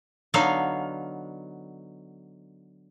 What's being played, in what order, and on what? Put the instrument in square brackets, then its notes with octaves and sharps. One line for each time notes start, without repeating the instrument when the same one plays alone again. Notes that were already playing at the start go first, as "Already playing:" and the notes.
[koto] D3 F#3 B3 D#4 F5